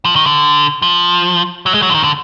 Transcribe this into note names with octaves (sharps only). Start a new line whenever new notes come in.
F3
D#3
D3
F3
F#3
G#3
F#3
D3
D#3
D3